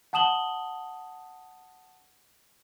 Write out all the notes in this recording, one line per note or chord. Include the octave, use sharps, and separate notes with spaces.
F#5 A5 D#6 E7 F#7 G7